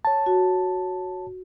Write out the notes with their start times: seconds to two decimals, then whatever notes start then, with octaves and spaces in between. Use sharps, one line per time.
0.05 C#5 A5
0.26 F#4